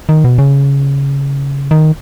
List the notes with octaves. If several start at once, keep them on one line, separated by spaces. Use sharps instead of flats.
D#3
B2
C#3
D#3